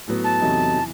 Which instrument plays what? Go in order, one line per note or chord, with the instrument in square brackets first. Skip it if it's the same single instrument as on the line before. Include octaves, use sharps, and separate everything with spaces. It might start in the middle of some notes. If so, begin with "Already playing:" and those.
[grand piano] A2 F#3 B3
[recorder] A5
[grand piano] E2 C3 F#3 A3 D#4
E3